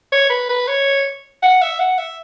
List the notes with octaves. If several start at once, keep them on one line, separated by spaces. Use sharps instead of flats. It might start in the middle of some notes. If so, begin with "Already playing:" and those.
C#5
B4
B4
C#5
F#5
E5
F#5
E5